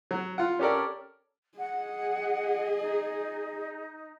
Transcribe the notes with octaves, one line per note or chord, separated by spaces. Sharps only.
F#3
F4 F#5
C#4 G4 A4 A#4 D5
G#4 D#5 F#5
D#4